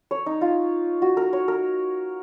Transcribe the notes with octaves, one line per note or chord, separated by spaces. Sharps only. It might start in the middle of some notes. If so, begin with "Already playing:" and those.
C#5
D#4
F4
F#4
A#4
C#5
A#4